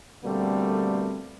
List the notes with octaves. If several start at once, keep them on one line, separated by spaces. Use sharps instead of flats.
B2 D3 G3 A3 A#3 C4